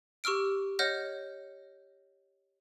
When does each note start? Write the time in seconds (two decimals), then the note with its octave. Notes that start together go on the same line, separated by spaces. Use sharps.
0.24 G4 C#6 E6 F6 D7
0.79 C#5 D#5 F#5 F6 G6 A#6